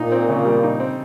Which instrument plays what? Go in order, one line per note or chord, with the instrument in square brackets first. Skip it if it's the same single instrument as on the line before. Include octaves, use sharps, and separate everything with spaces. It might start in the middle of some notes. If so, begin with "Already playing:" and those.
Already playing: [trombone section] A#2 [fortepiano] D#4
[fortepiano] C4
C#3
G3
D#4
C4